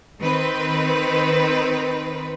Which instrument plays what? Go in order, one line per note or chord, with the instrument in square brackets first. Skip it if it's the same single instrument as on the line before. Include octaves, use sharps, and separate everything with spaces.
[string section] D#3 C4 B4